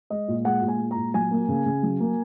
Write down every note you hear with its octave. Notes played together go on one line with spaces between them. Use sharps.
G#3 D#5
A#2
G#3 F#5
A#2
G#5
G#3
A#5
A#2
F#3 G#5
A#3
C#3
C#3
F#3
A#3